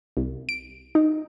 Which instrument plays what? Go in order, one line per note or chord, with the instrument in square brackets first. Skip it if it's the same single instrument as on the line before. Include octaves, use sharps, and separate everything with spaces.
[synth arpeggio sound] C2
D7
D#4